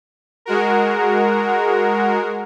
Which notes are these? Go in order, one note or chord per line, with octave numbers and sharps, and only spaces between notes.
G#3 F#4 A#4